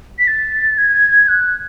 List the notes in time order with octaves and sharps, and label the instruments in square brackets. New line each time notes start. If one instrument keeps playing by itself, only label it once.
[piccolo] B6
A6
G#6
F#6